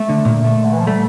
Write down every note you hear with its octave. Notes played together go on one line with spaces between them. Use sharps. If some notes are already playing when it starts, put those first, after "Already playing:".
Already playing: A3
D3
A#2
A3
D3
E3
F3
G3 A3